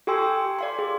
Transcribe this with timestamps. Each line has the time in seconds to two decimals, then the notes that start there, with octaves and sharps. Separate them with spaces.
0.07 G4 A4 G5 G#5 C6 E6
0.22 G5
0.59 D5 F5 C6
0.79 G#4